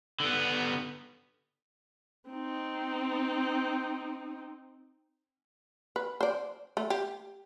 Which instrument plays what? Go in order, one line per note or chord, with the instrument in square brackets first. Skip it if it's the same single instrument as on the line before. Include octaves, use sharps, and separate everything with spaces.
[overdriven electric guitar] D3 B3
[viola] C4 D#4
[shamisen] B4
C5 D5
A3
G4